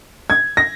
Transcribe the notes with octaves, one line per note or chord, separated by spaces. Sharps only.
G#6
A#6